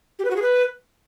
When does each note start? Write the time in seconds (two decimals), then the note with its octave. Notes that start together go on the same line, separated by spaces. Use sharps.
0.19 G4
0.25 B4
0.31 F#4
0.36 G#4
0.42 B4